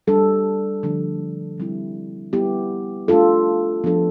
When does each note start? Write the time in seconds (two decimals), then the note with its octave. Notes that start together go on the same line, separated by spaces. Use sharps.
0.07 G3 D4 A4
0.83 D3 F3 A3 D4
1.58 C3 G3 C4 E4
2.33 G3 B3 E4 G4
3.08 A3 D4 F4 A4
3.84 F3 B3 D4 A4